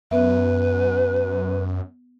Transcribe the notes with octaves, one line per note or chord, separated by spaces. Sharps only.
F#2 B3 B4 E5